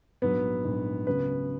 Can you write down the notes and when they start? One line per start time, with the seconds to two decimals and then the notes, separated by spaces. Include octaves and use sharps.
0.22 A#1 G#2 F#3 B3 B4
0.64 A#1 G#2 F#3
1.06 C#2 C#3 F#3 B3 B4